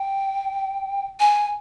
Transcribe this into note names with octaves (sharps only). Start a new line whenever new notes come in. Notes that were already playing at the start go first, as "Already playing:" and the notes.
Already playing: G5
G#5